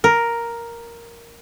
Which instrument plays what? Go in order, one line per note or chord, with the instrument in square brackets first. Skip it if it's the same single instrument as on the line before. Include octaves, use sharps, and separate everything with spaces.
[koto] A#4